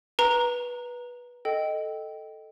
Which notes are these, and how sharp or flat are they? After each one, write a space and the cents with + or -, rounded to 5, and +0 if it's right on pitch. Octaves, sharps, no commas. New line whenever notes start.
B4 -15 A#5 +0
A4 +0 D#5 +0 G5 -10